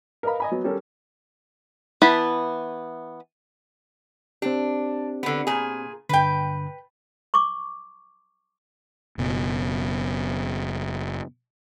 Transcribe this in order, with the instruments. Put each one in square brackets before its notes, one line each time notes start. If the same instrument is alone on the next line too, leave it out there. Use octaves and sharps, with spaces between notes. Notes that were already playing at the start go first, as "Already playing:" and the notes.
[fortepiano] A#4 B4 D#5 F5 B5
D#5 G#5 B5
F#3 B3
G3 C#4 A4 A#4
[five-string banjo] E3 B3 E4 A5 B5
[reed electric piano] C4 G4 [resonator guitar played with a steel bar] D4
[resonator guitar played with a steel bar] D3 B3
A#2 G#4
[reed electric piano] G2 D3 [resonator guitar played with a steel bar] B4 G5
[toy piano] C#6 D6
[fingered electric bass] F#1 B2